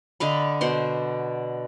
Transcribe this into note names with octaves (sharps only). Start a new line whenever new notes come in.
D3 D#5 F5 B5
B2 C5 C6